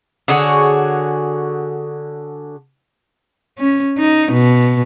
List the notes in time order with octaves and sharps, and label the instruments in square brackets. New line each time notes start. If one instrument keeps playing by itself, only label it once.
[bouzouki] D3 F#4 G#4 C#5
[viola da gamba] C#4
D#4
B2